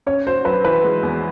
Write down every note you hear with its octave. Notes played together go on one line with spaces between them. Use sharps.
C#4 C#5
F#4 C5
F#3 B4
E3 B4
G#3
E2